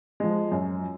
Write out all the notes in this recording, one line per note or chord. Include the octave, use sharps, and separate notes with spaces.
F3 G#3
F#2